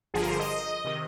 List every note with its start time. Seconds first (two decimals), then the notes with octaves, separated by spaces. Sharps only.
0.14 G1 G2 D3 F3 G#4
0.22 A#4
0.31 C5
0.40 D#5
0.84 C3 D#3